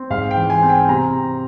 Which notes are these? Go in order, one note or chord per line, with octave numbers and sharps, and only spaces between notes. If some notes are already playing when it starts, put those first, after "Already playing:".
Already playing: C4
G#2 F5
G5
E3
G#5
C4
G5
C3 A#5